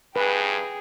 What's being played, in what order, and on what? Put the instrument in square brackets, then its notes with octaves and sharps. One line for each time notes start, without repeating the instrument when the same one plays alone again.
[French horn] G2 [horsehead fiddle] G#4 G5 [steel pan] B4